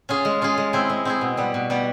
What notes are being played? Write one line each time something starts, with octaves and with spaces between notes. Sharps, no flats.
C#4 F4 G#4
G#3
C#4 F4 G#4
G#3
C4 E4 G#4
G#3
C4 E4 G#4
B2
G3 B3
B2
G3 B3